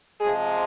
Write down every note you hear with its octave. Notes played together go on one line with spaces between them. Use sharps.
C3 F3 G#3 G#4